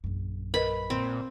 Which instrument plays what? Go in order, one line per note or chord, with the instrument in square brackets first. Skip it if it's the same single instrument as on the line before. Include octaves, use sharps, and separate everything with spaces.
[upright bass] A#1 F#2
[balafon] A#4 B4 D#5 [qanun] B5
[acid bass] A#2 [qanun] C4